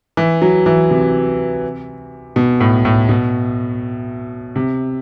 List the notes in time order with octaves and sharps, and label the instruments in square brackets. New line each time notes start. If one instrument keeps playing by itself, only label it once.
[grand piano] E3
F#3
E3
C3
B2
A2
A2
B2
C3